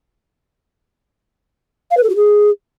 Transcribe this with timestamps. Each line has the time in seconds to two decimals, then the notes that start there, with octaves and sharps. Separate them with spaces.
1.91 F5
1.97 B4
2.03 A4
2.09 F#4
2.16 G#4